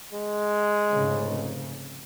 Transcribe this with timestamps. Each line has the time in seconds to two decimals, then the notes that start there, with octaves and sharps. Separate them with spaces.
0.13 G#3
0.93 F1 G#2 C#3